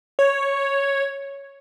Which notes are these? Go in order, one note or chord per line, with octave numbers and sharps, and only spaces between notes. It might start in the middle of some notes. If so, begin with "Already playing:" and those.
C#5